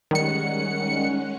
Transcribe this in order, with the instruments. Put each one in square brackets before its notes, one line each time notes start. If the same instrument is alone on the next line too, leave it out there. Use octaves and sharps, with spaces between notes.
[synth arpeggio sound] D#3 G3 C#7 [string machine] G#3 C#4 F#5